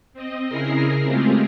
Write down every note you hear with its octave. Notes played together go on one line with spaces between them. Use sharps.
C4 D#5
C#3 E4 G#4 A#4 A#6 C7
G#3 A3 C4 F4 G4 G#4